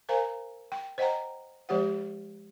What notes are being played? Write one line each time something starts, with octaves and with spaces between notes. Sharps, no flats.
A#4 C5 F5 G#5 A#5
G5
C5 D#5 F#5 G5 A#5
F3 G#3 G4 C5 F#5